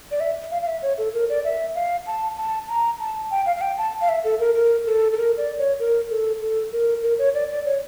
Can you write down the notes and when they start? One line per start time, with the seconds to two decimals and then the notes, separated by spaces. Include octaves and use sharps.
0.11 D5
0.20 E5
0.51 F5
0.62 F5
0.67 E5
0.82 C#5
0.98 A4
1.14 A#4
1.29 D5
1.44 E5
1.75 F5
2.07 A5
2.37 A5
2.69 A#5
3.00 A5
3.31 G5
3.46 F5
3.56 F5
3.61 G5
3.78 A5
4.01 F5
4.09 E5
4.24 A4
4.39 A#4
4.55 A#4
4.86 A4
5.13 A4
5.17 A#4
5.37 D5
5.58 C#5
5.79 A#4
6.10 A4
6.41 A4
6.72 A#4
7.03 A#4
7.18 C#5
7.34 D5
7.50 D5
7.66 C#5